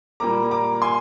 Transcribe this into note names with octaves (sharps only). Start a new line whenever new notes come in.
A#2 G3 A#3 A#5 D6
A#5 D6
G#5 C6